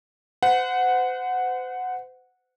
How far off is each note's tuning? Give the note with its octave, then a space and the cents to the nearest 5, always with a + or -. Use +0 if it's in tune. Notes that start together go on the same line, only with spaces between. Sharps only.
C5 -40 F#5 -5